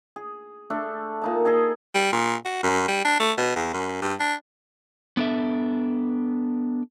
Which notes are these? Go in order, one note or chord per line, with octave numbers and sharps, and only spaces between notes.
G#4
A3 D4 A4
A#2 D#4 A5
G#4 A4 D#5 G#5
G3
A#2
F#4
F#2
G3
D4
A3
B2
E2
F#2
G2
D4
B3 D4 A4 E5